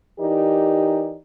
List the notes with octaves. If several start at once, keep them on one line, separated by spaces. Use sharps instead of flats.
E3 D#4 G4 A#4 D5